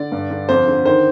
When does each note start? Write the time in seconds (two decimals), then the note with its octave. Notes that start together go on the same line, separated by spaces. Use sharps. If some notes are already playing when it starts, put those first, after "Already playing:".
Already playing: D3 D5
0.12 G2
0.30 D3
0.49 F2 C5
0.68 D3
0.85 D#3 C5